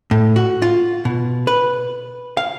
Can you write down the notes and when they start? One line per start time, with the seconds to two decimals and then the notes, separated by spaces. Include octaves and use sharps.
0.11 A2
0.36 F#4
0.62 F4
1.05 B2
1.47 B4
2.37 F5